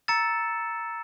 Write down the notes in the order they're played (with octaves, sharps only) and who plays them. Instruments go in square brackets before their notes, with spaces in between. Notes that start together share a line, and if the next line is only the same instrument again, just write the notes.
[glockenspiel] A#5 E6 A6 C#7 E7